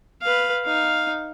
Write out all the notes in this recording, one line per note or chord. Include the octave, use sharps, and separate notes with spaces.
B4 F5
D#4 F5